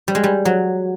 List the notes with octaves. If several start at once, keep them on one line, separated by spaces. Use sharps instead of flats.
G3
G#3
G3
F#3